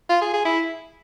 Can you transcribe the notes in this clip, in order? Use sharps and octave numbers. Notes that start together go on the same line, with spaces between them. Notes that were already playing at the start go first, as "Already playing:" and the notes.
F4
G#4
G#4
E4